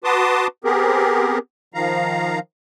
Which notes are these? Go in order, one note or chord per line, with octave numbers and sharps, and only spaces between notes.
F#4 B4 A5 C6 D6 D#6
B3 C4 G4 G#4 A#4
D#3 F3 F5 A#5